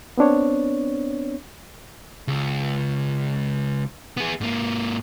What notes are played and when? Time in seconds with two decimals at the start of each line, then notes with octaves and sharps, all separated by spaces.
0.18 B3 C4 D4 C#5
2.28 C#2
4.17 B3 G#4
4.41 G#2 A#3